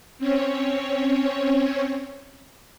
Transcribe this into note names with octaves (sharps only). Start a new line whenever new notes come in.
C4 C#4 C#5